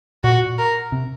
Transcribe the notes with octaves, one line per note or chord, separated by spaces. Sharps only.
A#2 F#4
A#4
C3